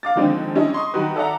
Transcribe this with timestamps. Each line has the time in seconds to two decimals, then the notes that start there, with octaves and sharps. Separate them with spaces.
0.03 F5 D6 A6
0.16 D3 D#3 F3 G#3 C4 D4
0.55 G3 C#4 D4 E4 D#5
0.73 D#5 C6 C#6 D#6
0.94 D#3 F#3 G3 D#4 F#4 B4
1.16 A4 D5 E5 F#5 A#5